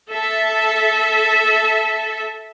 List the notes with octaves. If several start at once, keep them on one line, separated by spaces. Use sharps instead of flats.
A4 E5 A5